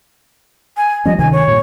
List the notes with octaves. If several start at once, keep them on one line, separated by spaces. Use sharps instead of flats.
G#5
F3 G3 C#4 D#5
D2 C3 D#3 G#5
C#5
G2 A#2